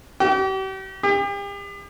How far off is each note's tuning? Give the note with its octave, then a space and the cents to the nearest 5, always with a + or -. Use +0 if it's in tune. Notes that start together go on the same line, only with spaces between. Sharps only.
G4 -40
G4 +40